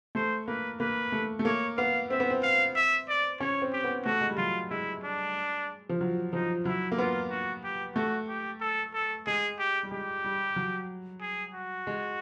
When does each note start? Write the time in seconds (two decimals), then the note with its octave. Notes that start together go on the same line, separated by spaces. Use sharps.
0.15 A3 C5
0.48 A#3 B4
0.80 A#3 B4
1.12 A3
1.39 A3
1.45 A#3 C#5
1.78 B3 F5
2.10 C4 E5
2.20 B3
2.30 C4
2.43 F5
2.76 E5
3.09 D5
3.40 C#4 C#5
3.62 C4
3.73 G4
3.84 B3
4.05 A3 F#4
4.21 G#3
4.30 G3
4.38 F#3 F4
4.70 G#3 E4
5.04 D4
5.89 F3
6.01 F#3
6.33 F3 D#4
6.65 F#3 E4
6.92 A#3
6.98 B3 F4
7.30 F#4
7.64 G4
7.96 A3 F#4
8.29 G4
8.61 A4
8.94 A4
9.27 G#3 G#4
9.59 G4
9.83 G3
9.91 G#3 G4
10.24 G3
10.56 F#3
11.21 G#4
11.54 F#4
11.87 G#3